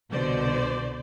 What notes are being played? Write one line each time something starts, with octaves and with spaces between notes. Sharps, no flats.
C2 B2 D3 C5 D5